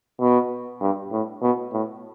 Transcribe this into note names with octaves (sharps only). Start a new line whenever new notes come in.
B2
G2
A2
B2
A2